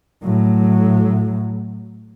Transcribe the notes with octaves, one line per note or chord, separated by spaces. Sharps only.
A2 F#3